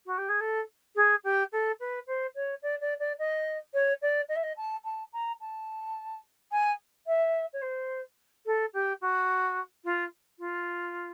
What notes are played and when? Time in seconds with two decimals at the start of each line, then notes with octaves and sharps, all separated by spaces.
0.06 F#4
0.18 G4
0.29 G#4
0.40 A4
0.95 G#4
1.24 G4
1.52 A4
1.80 B4
2.07 C5
2.35 C#5
2.62 D5
2.81 D5
2.99 D5
3.19 D#5
3.74 C#5
4.02 D5
4.28 D#5
4.35 E5
4.43 D#5
4.57 A5
4.84 A5
5.13 A#5
5.40 A5
6.51 G#5
7.07 E5
7.53 C#5
7.62 C5
8.46 A4
8.73 G4
9.01 F#4
9.84 F4
10.39 F4